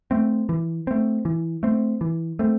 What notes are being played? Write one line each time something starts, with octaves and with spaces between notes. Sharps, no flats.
A3 C4
E3
A3 C4
E3
A3 C4
E3
A3 C4